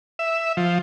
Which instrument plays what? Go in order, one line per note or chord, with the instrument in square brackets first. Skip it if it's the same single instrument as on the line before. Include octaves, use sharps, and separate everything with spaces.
[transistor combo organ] E5
F3